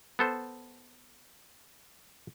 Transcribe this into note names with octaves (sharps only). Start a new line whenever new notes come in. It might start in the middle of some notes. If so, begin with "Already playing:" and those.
B3 A4 C5